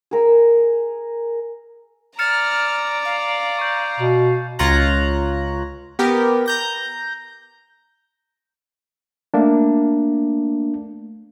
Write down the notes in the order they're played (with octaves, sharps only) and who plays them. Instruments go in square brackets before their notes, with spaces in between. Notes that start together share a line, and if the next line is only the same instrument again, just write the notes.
[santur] G#4 A#4 E6
[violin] D5 A#5 [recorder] F6 [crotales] A6 C#7 E7
[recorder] F5
[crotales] C#6 G6
[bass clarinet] B2
[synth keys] C#2 F4 C#5 A#5 F#6
B3 G4 A#4
A#5 G6 A#6
[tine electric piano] A3 A#3 D4